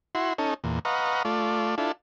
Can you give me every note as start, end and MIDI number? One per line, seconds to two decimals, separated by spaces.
0.15 0.33 64
0.15 0.33 66
0.15 0.33 84
0.38 0.54 61
0.38 0.54 63
0.38 0.54 69
0.64 0.79 40
0.64 0.79 46
0.85 1.23 71
0.85 1.23 75
0.85 1.23 77
0.85 1.23 78
0.85 1.23 82
0.85 1.23 85
1.25 1.75 57
1.25 1.75 65
1.25 1.75 74
1.78 1.92 62
1.78 1.92 64
1.78 1.92 65
1.78 1.92 69